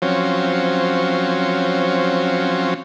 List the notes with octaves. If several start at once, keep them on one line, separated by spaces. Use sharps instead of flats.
F3 F#3 C4 C#4